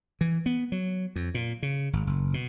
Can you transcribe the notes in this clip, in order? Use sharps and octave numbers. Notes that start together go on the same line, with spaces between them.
E3
B3
F#3
F2
A#2
C#3
G#1
F#1
B2